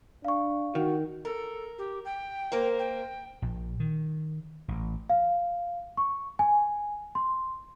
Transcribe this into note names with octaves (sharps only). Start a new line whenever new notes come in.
D4 F5 C#6
D#3 F#4
A4 A#4
G4
G5
A#3 A#4 C5
G5
A#1
D#3
A1
F5
C#6
G#5
C6